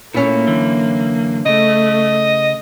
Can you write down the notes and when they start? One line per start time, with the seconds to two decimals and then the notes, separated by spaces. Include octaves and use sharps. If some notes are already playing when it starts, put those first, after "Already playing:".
0.14 A#2 A3 A#3 C#4 E4
0.47 F#2 D3 E3
1.46 C#3 A3 D#5